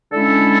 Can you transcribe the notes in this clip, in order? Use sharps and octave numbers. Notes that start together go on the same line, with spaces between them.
D3 G#3 C#4 E4 A4